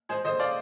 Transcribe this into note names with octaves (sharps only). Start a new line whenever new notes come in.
G#3 G#4 C5
D3 C5 D#5
D5 F5